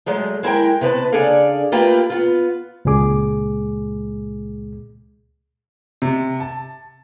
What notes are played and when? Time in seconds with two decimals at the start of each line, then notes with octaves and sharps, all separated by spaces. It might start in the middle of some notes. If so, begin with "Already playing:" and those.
0.06 F#3 G#3 A3
0.43 G#3 E4 A#4 G5
0.81 C3 B3 B4 A5
1.12 C#3 D4 G#4 A4 D5 F5
1.72 A3 A#3 F4 G4 B4
2.10 B3 F4
2.85 C#2 A#2 G#3 G#4 D6
6.02 C3
6.40 A5